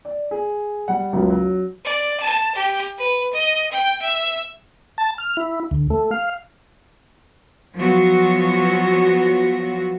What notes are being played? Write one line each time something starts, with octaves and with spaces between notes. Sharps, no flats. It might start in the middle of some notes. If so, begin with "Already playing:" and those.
D5
G#4
G3 F#5
F#1 C#2 F#2
F#3
D5
A5
G4
B4
D#5
G5
E5
A5
F6
E4
D2
A3
F5
F3 F#3 B3 F#4